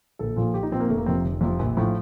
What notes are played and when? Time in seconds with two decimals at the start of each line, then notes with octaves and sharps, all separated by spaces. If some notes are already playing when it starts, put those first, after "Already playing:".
0.19 A#1 A4
0.36 A#2 F3
0.54 A#1 G4
0.63 D#4
0.72 A#2 F3 C4
0.80 A#3
0.89 F1 A3
0.98 A#3
1.06 F2 C3 F3 C4
1.24 F1
1.41 F2 C3 F3
1.59 A#1
1.77 A2 F3